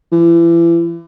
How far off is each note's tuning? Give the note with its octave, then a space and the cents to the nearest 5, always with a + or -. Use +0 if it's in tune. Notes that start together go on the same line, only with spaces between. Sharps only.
E3 +35